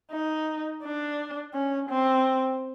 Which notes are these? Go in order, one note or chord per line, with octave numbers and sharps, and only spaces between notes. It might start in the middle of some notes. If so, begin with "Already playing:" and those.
D#4
D4
C#4
C4